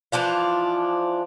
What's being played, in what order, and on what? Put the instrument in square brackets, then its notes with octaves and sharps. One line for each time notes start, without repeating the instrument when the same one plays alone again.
[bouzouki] E3 F3 D4 F4